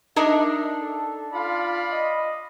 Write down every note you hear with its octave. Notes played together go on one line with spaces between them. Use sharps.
D4 D#4 A#4 E5
A4
F4 D5 F5 B5
D#5